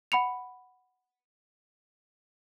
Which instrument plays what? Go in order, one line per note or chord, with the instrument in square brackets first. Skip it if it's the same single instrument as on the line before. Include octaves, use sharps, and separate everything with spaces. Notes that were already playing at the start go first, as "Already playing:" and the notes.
[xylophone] F#5 B5 C#7 F7